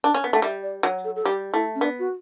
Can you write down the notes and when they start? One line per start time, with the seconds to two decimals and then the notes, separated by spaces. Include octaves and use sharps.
0.04 D4
0.14 C#4
0.24 B3
0.32 A3 F#5
0.42 G3 E5
0.63 D5
0.83 F#3 C#5
1.04 A4
1.16 A4
1.25 G3 G4
1.53 A3 E4
1.75 C#4
1.81 B3 D4
1.99 F#4